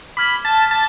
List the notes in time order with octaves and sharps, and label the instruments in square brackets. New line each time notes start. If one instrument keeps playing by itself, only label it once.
[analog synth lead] B5 [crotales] D6 F6 G#6 B6
[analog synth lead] A5
A5